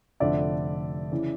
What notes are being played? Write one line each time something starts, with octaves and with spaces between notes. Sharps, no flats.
F1 F2 D3 D5 E5
C#3 E3